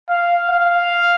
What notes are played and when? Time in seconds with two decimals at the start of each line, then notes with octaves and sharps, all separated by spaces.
0.09 F5
0.49 F5